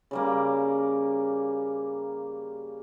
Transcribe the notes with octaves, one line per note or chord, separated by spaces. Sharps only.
C#3 G3 A#3